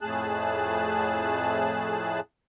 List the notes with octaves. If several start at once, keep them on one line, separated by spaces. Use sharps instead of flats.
F2 A2 A3 G#4 A5 F#6